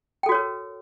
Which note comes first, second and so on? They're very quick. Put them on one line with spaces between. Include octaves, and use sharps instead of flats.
G5 A4 F#4 C#5 A#4